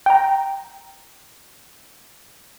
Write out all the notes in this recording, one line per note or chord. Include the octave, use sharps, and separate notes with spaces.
G5 A#5